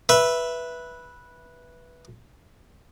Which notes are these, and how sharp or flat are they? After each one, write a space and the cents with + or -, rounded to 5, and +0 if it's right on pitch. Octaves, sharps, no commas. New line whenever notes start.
B4 -10 E5 +0